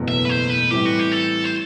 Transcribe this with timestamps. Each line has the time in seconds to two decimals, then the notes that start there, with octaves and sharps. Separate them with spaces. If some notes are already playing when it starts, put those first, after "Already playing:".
Already playing: F#1 E2 B2 A3
0.08 E5
0.25 B4
0.29 C5
0.50 B4
0.71 A2 E3 G3 C4 E4 G4
0.86 F#4
1.00 G4
1.12 A4
1.45 C5